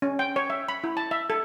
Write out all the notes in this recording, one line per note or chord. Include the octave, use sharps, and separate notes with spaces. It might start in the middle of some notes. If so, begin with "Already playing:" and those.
C#4
G5
C#5
E5
B5
E4
A5
E5
A4